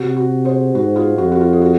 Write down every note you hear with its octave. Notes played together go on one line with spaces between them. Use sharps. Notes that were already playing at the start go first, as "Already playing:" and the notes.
Already playing: C3 F#4
F#4
G#4 C5
G#2 F#4
F4 G#4
F2 F#4
F#4
F4
G#4
F#4